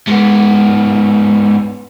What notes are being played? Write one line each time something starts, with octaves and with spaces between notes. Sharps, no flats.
G#2 B3